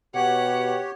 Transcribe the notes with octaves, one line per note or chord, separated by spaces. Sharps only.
B2 G4 C#5 F#5